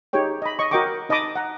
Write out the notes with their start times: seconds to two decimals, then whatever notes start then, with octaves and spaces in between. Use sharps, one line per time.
0.13 D#4 G4 G#4 C#5 G5
0.42 D#5 B5
0.59 D#5 C#6
0.71 F#4 A#4 D#5 G5 C#6 D6
1.09 D#4 D#5 A5 B5 D6 D#6
1.36 F#5 A#5